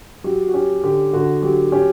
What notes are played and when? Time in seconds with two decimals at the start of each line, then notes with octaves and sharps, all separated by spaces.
0.24 F#3 G4
0.47 F#4
0.54 C#4 G4
0.83 D3 G4
1.13 D3 F#4
1.42 F#3 G4
1.72 C#4 G4